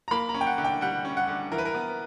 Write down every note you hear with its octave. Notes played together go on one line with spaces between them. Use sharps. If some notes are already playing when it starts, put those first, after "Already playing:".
A#5
A#3 B5
A#5
C#4
G5
F#5
D3
G5
G3 F#5
C#4
F#5
D3
E3 A#4
B4
A#4
B3